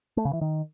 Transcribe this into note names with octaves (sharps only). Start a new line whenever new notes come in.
A3
C#3
E3
D#3